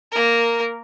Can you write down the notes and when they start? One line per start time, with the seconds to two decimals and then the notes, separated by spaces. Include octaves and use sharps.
0.12 A#3 A#4